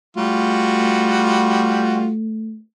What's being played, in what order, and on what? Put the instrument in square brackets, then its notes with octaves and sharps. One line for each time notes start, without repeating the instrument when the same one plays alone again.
[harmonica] G3 F4 F#4 [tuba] A3